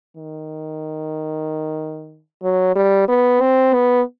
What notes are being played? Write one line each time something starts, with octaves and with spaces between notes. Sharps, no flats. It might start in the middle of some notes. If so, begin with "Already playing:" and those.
D#3
F#3
G3
B3
C4
B3